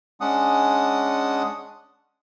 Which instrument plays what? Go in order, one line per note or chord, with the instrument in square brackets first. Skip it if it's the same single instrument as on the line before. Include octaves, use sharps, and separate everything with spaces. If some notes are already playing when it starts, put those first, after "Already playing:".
[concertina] G#3 C#4 D4 F#5 D#6